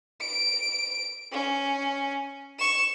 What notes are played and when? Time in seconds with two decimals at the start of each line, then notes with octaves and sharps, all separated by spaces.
0.20 D7
1.32 C#4
2.59 C#6 E7